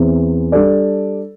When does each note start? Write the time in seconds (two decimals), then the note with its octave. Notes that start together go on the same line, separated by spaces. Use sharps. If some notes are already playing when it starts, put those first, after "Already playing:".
Already playing: E2 E3 C4
0.52 G3 D4 A4 D5